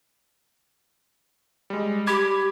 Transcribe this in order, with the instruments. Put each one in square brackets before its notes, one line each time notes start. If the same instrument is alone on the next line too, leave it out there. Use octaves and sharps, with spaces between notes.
[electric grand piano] G3 G#3
[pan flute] G4 [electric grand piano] B5 D6 G#6